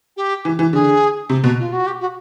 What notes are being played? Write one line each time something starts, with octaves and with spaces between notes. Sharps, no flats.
G4
E3
E3
D3 G#4
C3
B2
F4
F#4
G4
F#4